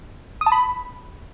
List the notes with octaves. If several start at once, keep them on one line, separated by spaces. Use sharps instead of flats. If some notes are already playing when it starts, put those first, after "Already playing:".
D#6
A5
B5